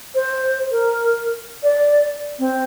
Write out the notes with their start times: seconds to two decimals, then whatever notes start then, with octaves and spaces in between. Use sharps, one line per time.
0.15 C5
0.71 A#4
1.63 D5
2.39 C4